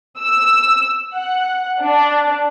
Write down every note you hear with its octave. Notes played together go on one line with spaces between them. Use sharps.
E6
F#5
D4